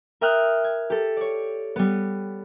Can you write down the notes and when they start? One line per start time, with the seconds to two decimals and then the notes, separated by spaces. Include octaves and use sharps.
0.21 A#4 E5 G5 D#6 F6 F#6
0.64 G#6
0.90 G4 A4
1.17 C#5 D5
1.76 G3 B3